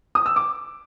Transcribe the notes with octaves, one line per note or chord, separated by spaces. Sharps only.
D#6
E6
D6